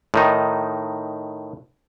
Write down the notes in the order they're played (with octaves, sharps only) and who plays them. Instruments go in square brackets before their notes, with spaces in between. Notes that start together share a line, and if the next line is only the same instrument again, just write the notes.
[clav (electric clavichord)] A2 D#3 D#4